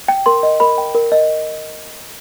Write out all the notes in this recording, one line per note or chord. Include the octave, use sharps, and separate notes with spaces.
G5
A#4 C6
D#5
A#4 B5
G5
A#4
D#5